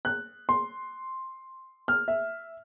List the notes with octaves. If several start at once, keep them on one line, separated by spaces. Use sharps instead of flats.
F#6
C6
F6
E5